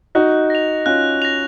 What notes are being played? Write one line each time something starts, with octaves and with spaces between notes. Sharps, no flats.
D#4 F#4 F#6
A#6 F7
C#4 F4 F#6
A#6 F7